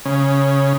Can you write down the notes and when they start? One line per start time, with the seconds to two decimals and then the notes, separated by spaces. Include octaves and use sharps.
0.05 C#3